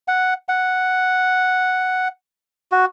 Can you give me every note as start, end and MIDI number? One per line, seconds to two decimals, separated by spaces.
0.08 0.34 78
0.49 2.08 78
2.72 2.85 66